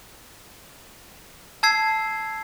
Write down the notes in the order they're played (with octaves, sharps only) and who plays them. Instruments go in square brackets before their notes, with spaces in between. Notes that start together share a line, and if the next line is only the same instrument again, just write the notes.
[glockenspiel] A5 E6 G#6 C7